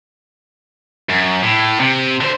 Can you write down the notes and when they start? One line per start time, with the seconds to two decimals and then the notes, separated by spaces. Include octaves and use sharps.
1.09 F#2
1.43 A2
1.80 C3
2.21 D3 C5